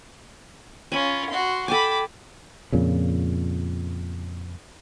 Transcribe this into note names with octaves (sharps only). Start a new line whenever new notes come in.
C#4 F4 G#5 B5
F#4 C6
A4 G5 G#5 B5 D6
F2 A#2 C#3